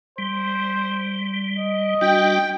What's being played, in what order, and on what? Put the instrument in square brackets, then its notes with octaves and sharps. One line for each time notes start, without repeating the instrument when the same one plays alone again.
[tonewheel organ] G3 [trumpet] C5
[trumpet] D#5
[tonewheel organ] G3 D4 F#4 [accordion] G5